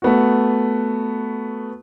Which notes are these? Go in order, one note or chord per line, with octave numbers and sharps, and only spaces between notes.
A3 B3 F#4